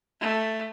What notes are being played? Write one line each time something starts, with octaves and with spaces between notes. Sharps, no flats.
A3